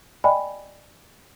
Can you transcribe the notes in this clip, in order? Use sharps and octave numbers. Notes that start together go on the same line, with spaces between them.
D5 D#5 G5 G#5 B5